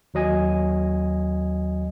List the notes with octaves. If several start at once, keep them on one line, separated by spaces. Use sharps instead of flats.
D#2 F#3 D#5 G#5